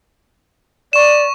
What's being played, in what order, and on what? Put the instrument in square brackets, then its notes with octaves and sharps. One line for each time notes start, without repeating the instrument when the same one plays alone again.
[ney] D5 [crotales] C#6 E7